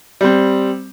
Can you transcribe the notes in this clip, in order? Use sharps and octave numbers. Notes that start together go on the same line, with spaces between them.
G3 C4